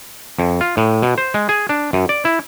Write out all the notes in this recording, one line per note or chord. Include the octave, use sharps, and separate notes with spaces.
F2
F4
A2
B2
C5
G#3
G#4
D4
F#2
D5
E4